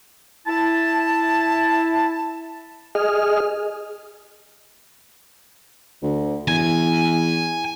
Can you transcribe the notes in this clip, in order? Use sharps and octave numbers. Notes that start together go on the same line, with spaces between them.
E4 A5
G#4 D#5 F6
D2
E2 G#5